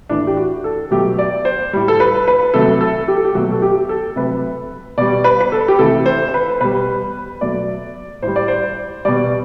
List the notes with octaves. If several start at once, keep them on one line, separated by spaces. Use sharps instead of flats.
A2 E3 A3 D4
G4
F#4
A4
B2 F#3 A3 G4
D5
C5
A2 G3
A4
B4
B4
C3 F#3 A3 A4
A4
G4
A4
G4
B2 F#3 A3 F#4
A4
G4
A4
C3 F#3 A3 B4
B2 G3 D5
B4
B4
A4
G4
C3 E3 A3 A4
C5
C5
B4
B2 G3 B4
B2 F#3 A3 D5
A2 G3 C5
D5
C5
B2 G3 D5